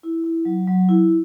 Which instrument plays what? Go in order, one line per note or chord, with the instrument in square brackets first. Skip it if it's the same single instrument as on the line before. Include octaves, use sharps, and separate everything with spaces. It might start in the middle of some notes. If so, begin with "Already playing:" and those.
[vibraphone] E4
E4
F#3
F#3
E4